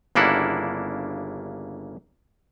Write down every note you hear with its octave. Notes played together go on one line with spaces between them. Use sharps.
G1 C#3 A#3 D4 E4 F#5